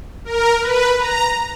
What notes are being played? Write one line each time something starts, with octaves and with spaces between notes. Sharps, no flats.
A#4
B4
A#5